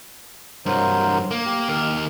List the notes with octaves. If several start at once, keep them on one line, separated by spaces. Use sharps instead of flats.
C2 G2 F#3 A#4 C5
A#3
G4
D#2 A#4